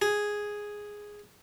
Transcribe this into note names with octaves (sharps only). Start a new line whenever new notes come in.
G#4